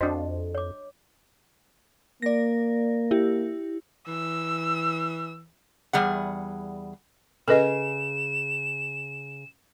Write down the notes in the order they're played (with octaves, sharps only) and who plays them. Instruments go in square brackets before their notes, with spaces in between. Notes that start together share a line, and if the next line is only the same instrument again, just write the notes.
[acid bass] F2 [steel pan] D4 F#4 C5 [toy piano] D#5
[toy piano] C#5 D6
[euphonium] A#3 [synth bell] D5 A#6
[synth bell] E4 G4
[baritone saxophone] E3 [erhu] E6
[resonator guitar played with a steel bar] E2 G3 G#4 F#5
[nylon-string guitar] C#3 G#4 [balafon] A4 B4 D#5 [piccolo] E7